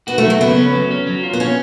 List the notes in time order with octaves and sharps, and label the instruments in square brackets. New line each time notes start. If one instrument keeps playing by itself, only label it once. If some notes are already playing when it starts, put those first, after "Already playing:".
[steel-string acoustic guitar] B3 [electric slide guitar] F#4
[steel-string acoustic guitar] A3
[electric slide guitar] F#3
[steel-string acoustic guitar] A3
[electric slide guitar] C#3 [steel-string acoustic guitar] B3
[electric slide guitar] C#4
F#3
C#4
F#3
F4
[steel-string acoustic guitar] B3
[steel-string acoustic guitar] C#4 [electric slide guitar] C#5